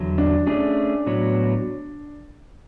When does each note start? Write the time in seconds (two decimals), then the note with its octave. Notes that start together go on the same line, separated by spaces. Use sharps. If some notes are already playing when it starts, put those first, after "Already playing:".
Already playing: E2 D3 F#3
0.18 D4
0.46 A3 C#4 D4 G#4
1.06 A2 F#3 B3 F#4 C#5